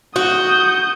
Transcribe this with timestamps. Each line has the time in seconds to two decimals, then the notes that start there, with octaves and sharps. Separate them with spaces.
0.16 F#4 D#6 G6